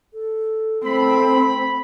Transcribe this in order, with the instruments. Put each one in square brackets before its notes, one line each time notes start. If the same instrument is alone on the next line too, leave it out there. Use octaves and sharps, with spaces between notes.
[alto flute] A4
[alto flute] A3 [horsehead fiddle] C4 [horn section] B5